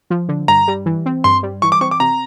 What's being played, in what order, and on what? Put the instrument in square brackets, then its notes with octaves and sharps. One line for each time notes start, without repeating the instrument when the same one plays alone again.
[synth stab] F3
D3
[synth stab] G2 [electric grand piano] A#5
[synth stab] G3
E3
C4
[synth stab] G2 [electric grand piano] C6
[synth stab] G3
[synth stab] E3 [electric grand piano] C#6
[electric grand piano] D6
[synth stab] C4 [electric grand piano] C#6
[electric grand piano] D6
[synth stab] C3 [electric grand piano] A#5